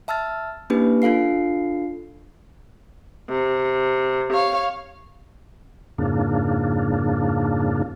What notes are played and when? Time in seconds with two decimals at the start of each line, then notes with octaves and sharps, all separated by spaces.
0.08 E5 A5 E6 F6 A6
0.70 A#3 C#4 D4 E4 G4 B4
1.02 D4 F4 A4 F5 C7
3.28 C3
4.32 C#5 F5
5.98 F2 G#2 C#3 A#3 D4